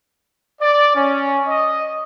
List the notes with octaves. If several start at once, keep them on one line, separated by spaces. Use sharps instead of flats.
D5
C#4
D#5